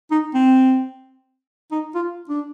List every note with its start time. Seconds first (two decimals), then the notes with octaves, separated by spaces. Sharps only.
0.11 D#4
0.34 C4
1.72 D#4
1.95 F4
2.29 D4